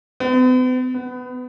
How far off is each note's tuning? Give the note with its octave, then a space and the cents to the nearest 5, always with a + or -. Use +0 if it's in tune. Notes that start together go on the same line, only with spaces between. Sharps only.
B3 +45
B3 +20